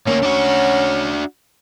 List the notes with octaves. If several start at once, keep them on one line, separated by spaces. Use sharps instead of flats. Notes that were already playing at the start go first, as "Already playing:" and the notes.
D2 A#3 C#4
D4 F#4